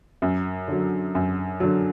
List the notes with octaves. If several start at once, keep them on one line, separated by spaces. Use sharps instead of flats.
F#2
D3 F#3
F#2
D3 F#3